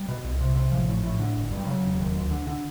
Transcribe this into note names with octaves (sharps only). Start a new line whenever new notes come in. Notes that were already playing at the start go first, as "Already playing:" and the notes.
Already playing: G3
B2
C2
C3
C3
A1 F3
A2
A2
D3
G1
G2
G3
C#3 F#3
E1
D#2
D2
D3
D3